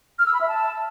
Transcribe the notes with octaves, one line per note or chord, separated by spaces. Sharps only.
F6
E6
B5
E5
A5